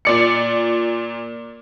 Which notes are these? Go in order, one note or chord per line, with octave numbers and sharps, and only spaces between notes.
A#2 D5 C#7